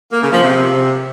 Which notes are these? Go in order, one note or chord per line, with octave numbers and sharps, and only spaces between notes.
A#3
C#3
F3
C3